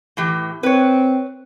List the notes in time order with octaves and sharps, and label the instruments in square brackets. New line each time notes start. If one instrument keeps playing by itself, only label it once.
[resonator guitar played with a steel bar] A2 E3 G4
[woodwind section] C4 [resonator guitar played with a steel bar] B4 C#5